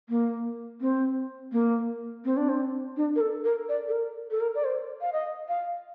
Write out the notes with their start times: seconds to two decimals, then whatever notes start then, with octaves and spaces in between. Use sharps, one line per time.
0.09 A#3
0.81 C4
1.52 A#3
2.25 C4
2.37 D4
2.49 C4
2.97 D4
3.16 A#4
3.21 A4
3.45 A#4
3.69 D5
3.88 A4
3.92 A#4
4.31 A4
4.40 A#4
4.55 D5
4.64 C5
5.01 F5
5.13 D#5
5.48 F5